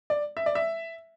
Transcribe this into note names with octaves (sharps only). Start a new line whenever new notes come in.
D5
E5
D5
E5